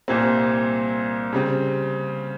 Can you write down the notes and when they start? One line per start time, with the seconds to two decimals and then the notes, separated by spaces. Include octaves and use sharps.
0.08 C2 A#2 G3 C4
1.33 C#3 G3 C4